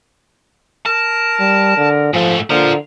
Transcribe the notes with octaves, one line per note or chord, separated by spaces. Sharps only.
A#4 A5
G3
D3
G#2 F3 A3
D3 F3 F4 A#4